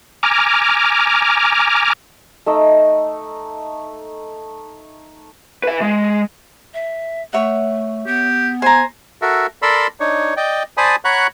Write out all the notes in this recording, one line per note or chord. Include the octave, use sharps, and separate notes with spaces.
G#5 A#5 D6 F6
A3 D#4 E6
B4 E5
G#3
E5
A3 C#5 E5 F#5
B3 G4
C5 G#5 A#5
F#4 A4 A#4 E5
A4 A#4 D5 B5 C6 E6
D4 D#4 C#5
D5 D#5 G5
C5 D5 G#5 A5 B5 D#6
C#5 F#5 A#5 B5 C#6 F#6